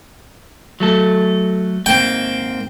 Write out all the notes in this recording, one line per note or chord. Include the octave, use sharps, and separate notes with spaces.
F#3 A3 A4
G#2 A#3 C4 G5